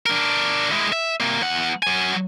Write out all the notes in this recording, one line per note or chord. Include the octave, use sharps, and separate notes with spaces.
D4 A#4
G#3 E4
E5
C3 A#3
E2 F#5
F#3 G#5